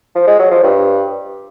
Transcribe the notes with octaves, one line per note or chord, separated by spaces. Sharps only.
F3
G#3
F#3
F3
G2